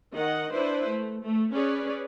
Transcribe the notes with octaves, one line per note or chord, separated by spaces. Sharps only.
D#3 D#5 F#5
D4 E4 B4 C5
A3
A3
C#4 G#4 B4 C#5 D5